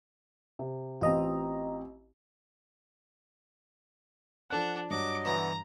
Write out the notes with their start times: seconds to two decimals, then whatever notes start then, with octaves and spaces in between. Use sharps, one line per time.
0.59 C3
1.01 A1 C4 F4 D#5 A#5
4.50 F3 D4 A4 F#5 F#6
4.90 G2 F#3 D#5 D6
5.25 B2 D3 E3 A#5